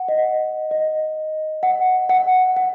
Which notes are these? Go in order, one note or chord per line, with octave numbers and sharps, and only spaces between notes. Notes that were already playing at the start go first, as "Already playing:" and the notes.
Already playing: F#5
D#5
D#5
F#5
F#5
F#5